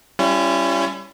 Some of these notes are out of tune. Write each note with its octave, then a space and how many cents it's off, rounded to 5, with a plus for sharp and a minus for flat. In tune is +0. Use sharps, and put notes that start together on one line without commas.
G3 +0 C#4 +0 E4 +40